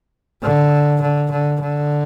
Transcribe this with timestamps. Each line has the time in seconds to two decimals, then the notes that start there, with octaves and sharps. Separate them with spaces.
0.42 D3
1.01 D3
1.31 D3
1.60 D3